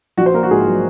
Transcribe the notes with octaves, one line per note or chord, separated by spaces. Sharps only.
A#1 F#4
C5
A#3 A#4
F#4
G#2 G#4
F#3